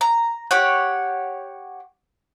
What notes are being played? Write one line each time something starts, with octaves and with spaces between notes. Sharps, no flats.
A#5
G4 C#5 F#5